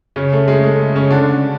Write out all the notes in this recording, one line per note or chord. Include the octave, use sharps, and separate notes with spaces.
C#3 C#4
A3
G#3
A3
C#3 C#4
D3 D4